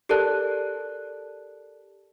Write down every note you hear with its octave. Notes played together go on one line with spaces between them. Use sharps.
G4 A4 A#4 D5 A5 F#6